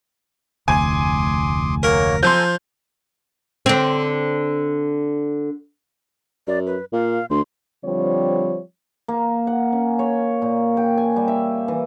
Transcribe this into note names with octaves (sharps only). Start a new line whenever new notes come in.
F1 D2 G#5 C6 D6 D#6
F#3 A#3 A#4 C#5
F3 A4 G#5 A#5 C6 G6
D3 C4
F#2 D5
B4
A#2 F5
D2 C6
D3 F3 G3 C4 C#5
A#3
F#5
C#4
C#5
A#2
G5
G#5
G3
E5
E3